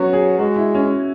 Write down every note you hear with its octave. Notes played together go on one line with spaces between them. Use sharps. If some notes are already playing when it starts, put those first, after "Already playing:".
Already playing: F#3 B3 C#4 F#4
G#4
G#3 F#4
E4
C#4